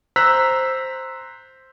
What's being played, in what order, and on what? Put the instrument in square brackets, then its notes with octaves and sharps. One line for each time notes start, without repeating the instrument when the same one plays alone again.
[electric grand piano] C5 A#5 E6 F#6 B6